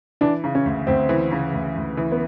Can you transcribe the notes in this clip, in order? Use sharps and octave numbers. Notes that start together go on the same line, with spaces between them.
E3 D4
C#3
C#4
D2
D2 C4
E3
C#3
D2
D2
E3
B3